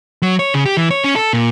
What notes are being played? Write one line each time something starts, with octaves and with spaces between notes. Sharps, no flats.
F#3
C#5
C#3
G4
E3
C#5
C#4
A4
A#2